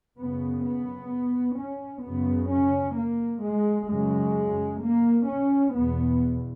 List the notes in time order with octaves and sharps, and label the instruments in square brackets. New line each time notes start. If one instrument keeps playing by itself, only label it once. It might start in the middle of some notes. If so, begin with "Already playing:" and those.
[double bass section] F#2 C#3 B3
B3
C#4
F#2 C#3 B3
C#4
A#3
G#3
F#2 C#3 G#3
A#3
C#4
E2 B2 B3